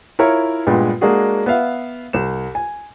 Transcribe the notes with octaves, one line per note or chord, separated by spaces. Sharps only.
E4 F4 A#4 C#5 E5
G2 A#2 G#3 B3 B4 G5
G#3 A#3 D4 F#4 G#4
B3 B4 E5 F5
C2 E7
G#5